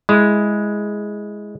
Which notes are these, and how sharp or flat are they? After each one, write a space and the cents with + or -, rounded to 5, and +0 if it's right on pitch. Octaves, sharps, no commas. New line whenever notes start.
G#3 +0 E4 +0